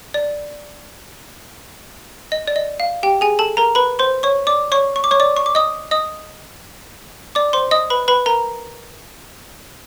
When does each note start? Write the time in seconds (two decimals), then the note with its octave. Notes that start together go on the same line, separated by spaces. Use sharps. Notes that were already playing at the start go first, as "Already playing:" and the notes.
0.14 D5
2.32 D#5
2.48 D5
2.56 D#5
2.80 F5
3.03 G4 G5
3.21 G#4 G#5
3.39 A4 A5
3.57 A#4 A#5
3.75 B4 B5
3.99 C5 C6
4.23 C#5 C#6
4.47 D5 D6
4.72 C#5 C#6
4.96 C#6
5.04 D6
5.11 C#5 C#6
5.20 D5 D6
5.37 C#6
5.46 D6
5.55 D#5 D#6
5.91 D#5 D#6
7.35 D5 D6
7.53 C5 C6
7.71 D#5 D#6
7.90 B4 B5
8.08 B4 B5
8.26 A#4 A#5